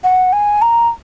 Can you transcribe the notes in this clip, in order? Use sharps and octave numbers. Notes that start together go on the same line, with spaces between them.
F#5
G#5
A#5